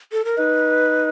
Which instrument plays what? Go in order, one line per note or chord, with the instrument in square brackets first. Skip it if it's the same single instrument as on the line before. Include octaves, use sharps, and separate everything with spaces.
[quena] A4
A#4
[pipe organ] D#4 [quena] B4